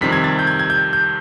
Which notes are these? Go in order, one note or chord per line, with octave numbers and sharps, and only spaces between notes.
F2 C3 D#3 G3 C4 B6
G#6
A6
G6
G#6
G#6
G6
G6